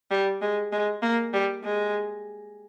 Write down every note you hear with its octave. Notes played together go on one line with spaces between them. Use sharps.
G3
G#3
G#3
A#3
G3
G#3